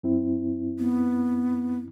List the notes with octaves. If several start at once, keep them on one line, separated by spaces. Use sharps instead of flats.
F#2 C4 E4
B3